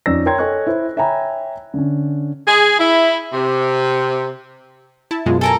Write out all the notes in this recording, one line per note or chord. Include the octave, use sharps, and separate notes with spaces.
F2 C#4 D#4 D5 E6 A#6
A#4 C#5 G5 A#5 C6 G#6
A4 C#5 D#5 G#5 C#6 F#6
E4 C5
C#5 E5 G5 G#5 A#5 B5
D3 C#4
G#4
E4
C3
E4 A5
F#2 B2 G#3 F4
A4 A#4 G#5 A#5